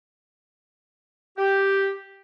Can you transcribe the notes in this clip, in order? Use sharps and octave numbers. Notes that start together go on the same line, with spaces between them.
G4